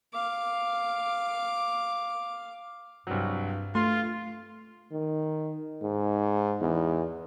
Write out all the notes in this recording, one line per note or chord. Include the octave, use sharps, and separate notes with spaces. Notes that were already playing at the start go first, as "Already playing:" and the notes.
F5 D6
C2 G2 F#3
A3 F4 C6
D#3
G#2
E2